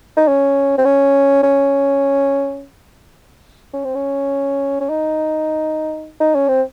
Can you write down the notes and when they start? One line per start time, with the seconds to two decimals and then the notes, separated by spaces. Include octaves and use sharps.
0.17 D#4
0.28 C#4
0.78 C4
0.85 C#4
1.43 C#4
3.74 C#4
3.85 C4
3.95 C#4
4.80 C#4
4.89 D#4
6.20 D#4
6.35 C#4
6.48 C4